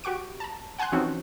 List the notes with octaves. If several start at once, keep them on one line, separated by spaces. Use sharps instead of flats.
F#4 G4 F#5 C#6 D7
A5 A#5
F#5 G#5 A5 C6 F#6
E3 F3 C4 C#4 D#4 F#4